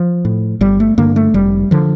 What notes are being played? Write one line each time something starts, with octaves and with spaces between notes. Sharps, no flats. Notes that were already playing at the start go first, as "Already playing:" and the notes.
Already playing: F3
A2
G1 G3
A3
G2 D3 A#3
A3
F1 G3
D3 F3